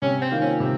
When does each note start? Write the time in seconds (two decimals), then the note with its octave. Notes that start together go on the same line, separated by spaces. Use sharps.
0.02 C3 C#4
0.22 C4
0.31 D#3 A#3 F4
0.41 C#4
0.60 C3 C4